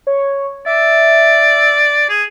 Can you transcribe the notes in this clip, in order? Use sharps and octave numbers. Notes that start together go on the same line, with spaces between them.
C#5
D5 E5
G#4